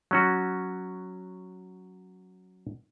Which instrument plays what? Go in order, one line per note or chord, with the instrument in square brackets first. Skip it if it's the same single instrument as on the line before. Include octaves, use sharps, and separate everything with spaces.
[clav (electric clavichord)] F#3 C#4 F#4